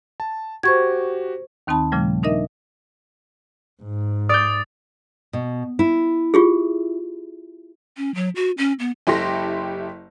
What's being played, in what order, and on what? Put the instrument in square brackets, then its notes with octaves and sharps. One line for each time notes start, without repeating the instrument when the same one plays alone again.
[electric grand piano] A5
[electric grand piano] F#4 G4 [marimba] C5 C#6 G#6
[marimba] D#2 D#3 C4 D#4 A5 B5
A#2 C#3 F3 G3 A3
D4 D#4 A#4 D#5 E5
[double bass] G#2
[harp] D5 G6 [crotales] D#6 A6
[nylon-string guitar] B2
E4
[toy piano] F4 G4 G#4
[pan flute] C#4
F#3
F#4
C#4
B3
[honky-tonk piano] F#1 E4 G4 A4 C6 A#6